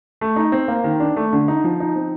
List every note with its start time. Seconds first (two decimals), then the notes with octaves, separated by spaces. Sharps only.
0.21 A3
0.36 D#4
0.52 C4
0.68 A#3
0.84 D#3
1.00 D4
1.16 A3
1.33 D3
1.48 D#4
1.64 F3
1.80 D#4
1.96 C4